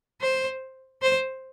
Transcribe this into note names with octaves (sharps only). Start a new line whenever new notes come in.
C5
C5